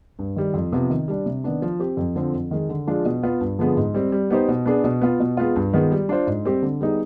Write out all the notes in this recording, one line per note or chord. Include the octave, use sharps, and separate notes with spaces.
G2
D#3 G3
F2
C3 F3 B3
D#3
G3 D4
C3
D#3 B3 D4
F3
C4 G4
F2
D3 F3 C4
F2
D#3 G#3
D3
F3 G#3 D4 F4
B2
B3 F4
G2
D3 F3 G#3 B3
G#2
G3 C4
G3
B3 D#4 G4 C5
B2
B3 D4 G#4
B2
B3 F4
B2
G#3 B3 F4
G2
D#3 G#3 B3 F4
G3
D4 F4 C5
G#2
G3 C4 G4
D3
G3 B3 D#4 G#4